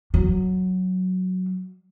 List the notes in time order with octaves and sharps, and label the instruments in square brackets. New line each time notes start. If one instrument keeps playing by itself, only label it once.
[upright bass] F#3